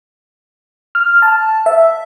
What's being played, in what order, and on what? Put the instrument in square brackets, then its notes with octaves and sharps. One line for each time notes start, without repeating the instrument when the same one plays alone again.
[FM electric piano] F6
A5
E5